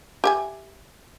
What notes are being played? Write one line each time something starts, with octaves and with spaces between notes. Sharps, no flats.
G4 E5 G#5